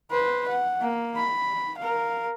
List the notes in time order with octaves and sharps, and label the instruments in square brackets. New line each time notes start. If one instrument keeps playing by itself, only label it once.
[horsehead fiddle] B4 C5
F#5
A#3
B5
A#4 F5